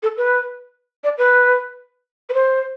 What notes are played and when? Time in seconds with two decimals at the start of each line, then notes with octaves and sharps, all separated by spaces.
0.03 A4
0.17 B4
1.04 D5
1.18 B4
2.29 B4
2.34 C5